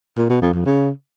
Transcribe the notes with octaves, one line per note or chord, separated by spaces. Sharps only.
A#2
B2
F2
F2
C#3